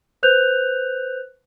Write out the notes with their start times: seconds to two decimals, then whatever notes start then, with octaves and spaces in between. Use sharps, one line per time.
0.23 B4 C5 F#6 G6 F7